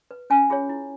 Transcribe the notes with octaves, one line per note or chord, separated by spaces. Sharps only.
B4
C#4 G#5
F4 G#4 C#5
E4